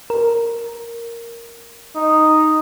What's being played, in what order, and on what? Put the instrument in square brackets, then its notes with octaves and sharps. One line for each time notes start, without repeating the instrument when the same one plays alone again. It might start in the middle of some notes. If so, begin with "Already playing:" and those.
[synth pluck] A#4
[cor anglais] D#4